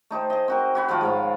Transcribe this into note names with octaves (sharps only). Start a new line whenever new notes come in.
A3 D#4 G4 C5
G#4 D#5
C4 F#4 A#4
F#4 G#5 B5
D#3 F3 A3 F4
G#2 C#5 F5